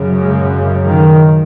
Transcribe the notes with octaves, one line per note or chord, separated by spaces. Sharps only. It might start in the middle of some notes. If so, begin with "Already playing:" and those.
Already playing: F#2 C#3
G#3
D#3